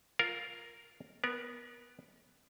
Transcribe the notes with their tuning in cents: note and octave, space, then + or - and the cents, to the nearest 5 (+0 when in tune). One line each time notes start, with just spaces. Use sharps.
F4 +0 A#4 +0 F5 +15
B3 +0 A#4 +35